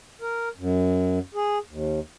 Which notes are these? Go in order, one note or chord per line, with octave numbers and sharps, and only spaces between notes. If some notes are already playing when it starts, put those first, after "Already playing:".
A#4
F#2
G#4
D#2